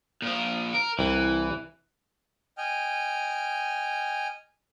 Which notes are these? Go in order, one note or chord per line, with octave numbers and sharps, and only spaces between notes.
A#2 F3
A#4
C2 E3
D#5 G5 G#5 F6